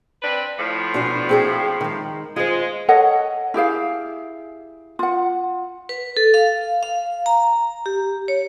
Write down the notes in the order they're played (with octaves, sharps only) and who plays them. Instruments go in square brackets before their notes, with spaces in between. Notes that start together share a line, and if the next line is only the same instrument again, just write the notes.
[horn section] C4 D4 B4
A2 F3
[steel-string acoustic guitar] B2 D4 G#5
C4 G#4 G5
D#3 G#3
[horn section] G#3 [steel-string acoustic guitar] F4 C5
[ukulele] A4 C#5 D#5 F#5
E4 G4 G#4 F5
F4 F#5
[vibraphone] B4
A4
F5
F5
A#5
G4
C#5